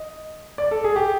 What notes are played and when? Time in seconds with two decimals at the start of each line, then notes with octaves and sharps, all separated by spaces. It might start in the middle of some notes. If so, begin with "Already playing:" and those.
Already playing: D#5
0.58 D5
0.71 A4
0.84 G#4
0.96 G4